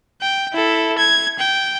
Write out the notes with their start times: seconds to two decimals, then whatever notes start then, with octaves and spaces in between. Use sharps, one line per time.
0.22 G5
0.53 E4 A4
0.98 G#6
1.39 G5